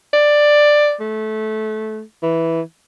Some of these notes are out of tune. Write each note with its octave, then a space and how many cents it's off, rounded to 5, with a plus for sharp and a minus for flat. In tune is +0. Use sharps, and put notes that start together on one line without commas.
D5 +10
A3 -20
E3 -5